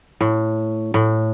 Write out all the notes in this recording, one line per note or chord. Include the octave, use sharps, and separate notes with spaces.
A2
A2